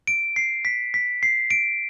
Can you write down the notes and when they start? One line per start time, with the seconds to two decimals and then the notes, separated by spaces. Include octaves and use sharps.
0.07 D7
0.36 C7
0.65 B6
0.94 B6
1.23 C7
1.51 D7